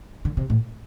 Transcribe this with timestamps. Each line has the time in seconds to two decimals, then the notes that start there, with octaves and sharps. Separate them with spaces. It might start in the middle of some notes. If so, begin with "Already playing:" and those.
0.25 D3
0.37 C3
0.50 A2